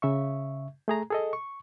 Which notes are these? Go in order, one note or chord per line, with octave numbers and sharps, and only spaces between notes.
C#3 E5 C#6
A3 G#4 A#5
G#4 A4 D#5
C#6